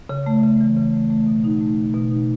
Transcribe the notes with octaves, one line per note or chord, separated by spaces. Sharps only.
C#3
A3
C#3
E3
C#3
A3
A3
B2
D#4
A3
B2
B2
D#4